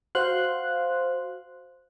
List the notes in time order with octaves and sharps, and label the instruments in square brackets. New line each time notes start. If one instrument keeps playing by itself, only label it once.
[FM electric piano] F#4 C5 F5 C6 F#6